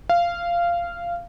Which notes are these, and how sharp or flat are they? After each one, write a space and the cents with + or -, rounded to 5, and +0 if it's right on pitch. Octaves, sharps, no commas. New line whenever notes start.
F5 -15